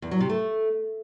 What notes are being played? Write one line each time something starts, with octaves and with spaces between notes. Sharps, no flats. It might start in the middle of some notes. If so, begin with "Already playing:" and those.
E2
F#3
C3
A3